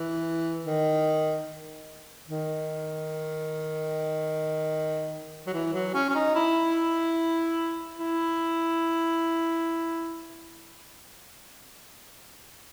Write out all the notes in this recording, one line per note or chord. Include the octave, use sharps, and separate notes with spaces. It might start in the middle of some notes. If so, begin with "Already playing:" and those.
Already playing: E3
D#3
D#3
F#3
E3
F#3
C#4
C#4
D#4
E4
E4